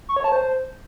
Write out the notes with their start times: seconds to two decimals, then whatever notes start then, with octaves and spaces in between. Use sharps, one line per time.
0.09 C#6
0.16 C#5
0.24 A5
0.32 C5